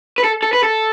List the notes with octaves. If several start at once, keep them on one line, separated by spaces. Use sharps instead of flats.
B4
A4
A4
B4
A4